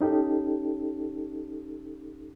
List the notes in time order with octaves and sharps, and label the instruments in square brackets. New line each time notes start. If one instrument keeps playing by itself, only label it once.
[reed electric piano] C#4 D#4 G4 A4